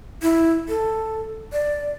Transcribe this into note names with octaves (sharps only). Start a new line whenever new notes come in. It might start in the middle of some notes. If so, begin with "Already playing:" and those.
E4
A4
D5